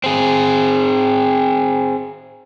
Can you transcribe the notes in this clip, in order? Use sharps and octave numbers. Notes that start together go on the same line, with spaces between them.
C4 G#4